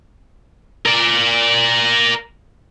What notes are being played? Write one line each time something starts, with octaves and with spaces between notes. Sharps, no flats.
A#4 D5